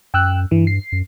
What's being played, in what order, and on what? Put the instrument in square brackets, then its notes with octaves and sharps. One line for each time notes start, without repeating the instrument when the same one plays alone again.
[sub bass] F#2 [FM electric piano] G5 E6 F#6
[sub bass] G2 [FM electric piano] E3
[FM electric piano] C7
[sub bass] F#2